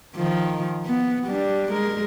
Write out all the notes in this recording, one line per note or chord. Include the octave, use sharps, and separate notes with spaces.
D#3 F3
B3
G3 D4
G#3 A#4